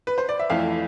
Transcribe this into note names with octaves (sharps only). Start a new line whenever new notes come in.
B4
C5
D5
E5
F2 E3 A3 F5